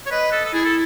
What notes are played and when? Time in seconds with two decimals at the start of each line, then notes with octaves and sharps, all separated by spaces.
0.06 C#5
0.11 B4 D#5
0.32 A4
0.45 A4
0.53 E4 G#4
0.65 A4